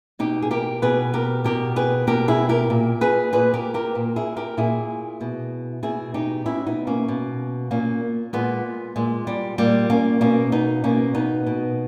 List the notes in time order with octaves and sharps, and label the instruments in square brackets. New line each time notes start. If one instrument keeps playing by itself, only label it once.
[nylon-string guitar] B2 D#4 G4
G#4
G4 A#4
B2 G#4 B4
G4 A#4
B2 G4 A#4
G#4 B4
B2 G4 A#4
E4 G#4
G4 A#4
A#2
G#4 B4
A#2 G#4 B4
G4 A#4
G4 A#4
A#2
E4 G#4
G4 A#4
A#2 E4 G#4
B2
B2 E4 G#4
D#4 G4
B2 C#4 E4
B3 D#4
A#3 C#4
B2
A#2 A#3 C#4
A#2 G#3 B3
A#2 G#3
G3
A#2 G3 A#3
A#3 C#4
B2 A#3 C#4
B3 D#4
B2 A#3 C#4
B3 D#4
B2